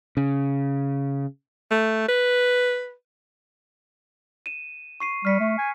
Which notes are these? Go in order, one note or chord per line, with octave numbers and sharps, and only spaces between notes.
C#3
A3
B4
D#7 E7
C#6 C7 D#7
G3 F6 B6 C#7
A3
G#5